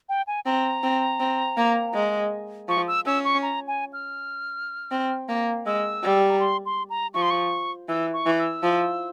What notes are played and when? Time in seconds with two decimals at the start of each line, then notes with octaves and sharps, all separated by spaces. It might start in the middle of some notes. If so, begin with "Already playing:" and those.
0.09 G5
0.27 G#5
0.46 C4 A#5
0.83 C4
1.20 C4
1.57 A#3
1.94 G#3
2.69 F3 C#6
2.88 E6
3.06 C#4 E6
3.25 C#6
3.43 A#5
3.68 G#5
3.93 F6
4.91 C4
5.29 A#3
5.66 G#3 E6
6.03 G3
6.29 A#5
6.40 C6
6.66 C6
6.90 A#5
7.14 F3 C#6
7.22 C6
7.30 C#6
7.89 E3 E6
8.13 C#6
8.26 E3
8.39 E6
8.63 F3